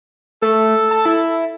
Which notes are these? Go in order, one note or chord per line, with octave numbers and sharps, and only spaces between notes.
A3 A4
A5
E4